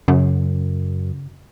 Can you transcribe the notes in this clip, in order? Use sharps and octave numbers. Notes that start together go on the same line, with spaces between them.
F#2 C#3